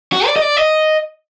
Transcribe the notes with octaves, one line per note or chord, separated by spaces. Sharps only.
F#4
D5
D#5
D5
D#5